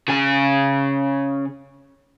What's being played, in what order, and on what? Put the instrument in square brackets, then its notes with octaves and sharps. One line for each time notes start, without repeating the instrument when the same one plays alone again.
[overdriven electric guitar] C#3 G#5